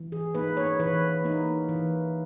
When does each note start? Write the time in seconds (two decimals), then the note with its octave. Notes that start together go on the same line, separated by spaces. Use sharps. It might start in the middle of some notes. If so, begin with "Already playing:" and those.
Already playing: E3
0.12 G#4
0.34 A#3 D#4 B4
0.57 C#5
0.79 E3 B4
1.24 A#3 D#4
1.69 E3